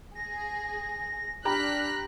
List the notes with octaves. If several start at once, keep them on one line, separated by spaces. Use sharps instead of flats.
G#4 A#6
D4 G4 A#5 B5 F6 F#6 A#6 B6